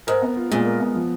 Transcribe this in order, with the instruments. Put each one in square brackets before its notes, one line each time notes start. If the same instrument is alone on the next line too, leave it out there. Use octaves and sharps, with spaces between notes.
[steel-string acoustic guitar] G#2 [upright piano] A#4
[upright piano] B3
F4
[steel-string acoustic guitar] A#2 [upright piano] G#3
[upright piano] A#4
B3
F3